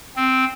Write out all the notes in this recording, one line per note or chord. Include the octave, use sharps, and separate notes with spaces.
C4